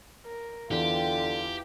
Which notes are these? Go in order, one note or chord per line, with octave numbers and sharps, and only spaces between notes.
A#4
E2 D3 E3 F4 G4